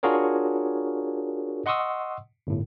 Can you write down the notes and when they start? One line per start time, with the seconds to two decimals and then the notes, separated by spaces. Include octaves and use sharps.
0.03 D4 F4 F#4 G#4 A#4 C#5
1.66 D#5 F#5 C6 C#6 D#6 E6
2.47 G1 A2